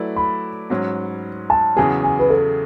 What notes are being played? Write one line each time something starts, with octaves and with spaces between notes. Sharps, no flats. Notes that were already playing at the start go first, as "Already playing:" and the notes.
Already playing: F#3 A3 E4 B4 D5
B5
G#2 F#3 C#4
A5
E2 C#3 F#3 C#4 G#4 G#5
G#5
B4
A4